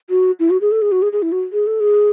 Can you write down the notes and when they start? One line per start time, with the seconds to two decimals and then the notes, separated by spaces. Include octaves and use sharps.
0.10 F#4
0.40 E4
0.50 F#4
0.61 G#4
0.72 A4
0.82 G#4
0.92 F#4
1.02 G#4
1.13 G#4
1.22 E4
1.32 F#4
1.53 G#4
1.67 A4
1.80 G#4